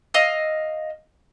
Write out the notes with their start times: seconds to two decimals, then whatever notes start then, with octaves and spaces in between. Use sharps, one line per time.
0.14 D#5 F5 E6